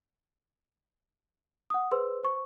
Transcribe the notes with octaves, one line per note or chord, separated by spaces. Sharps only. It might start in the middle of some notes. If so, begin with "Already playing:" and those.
F#5 D#6
G#4 B4 C5 C6 E6
C5 C#6